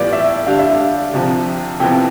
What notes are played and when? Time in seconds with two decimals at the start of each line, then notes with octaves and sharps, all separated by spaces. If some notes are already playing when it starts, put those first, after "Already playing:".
Already playing: A2 E3 G3 B3 F4 D5
0.13 E5
0.47 D3 G3 D4 G4 F5
0.59 E5
0.74 F5
1.13 C2 C3 F3
1.80 F2 C3 F3 B3 E4 G5